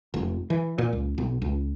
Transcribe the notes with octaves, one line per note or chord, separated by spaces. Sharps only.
F1
E3
A#2
C#2
B1
C#2